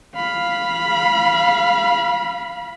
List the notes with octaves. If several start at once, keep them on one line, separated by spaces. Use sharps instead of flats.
F5 B5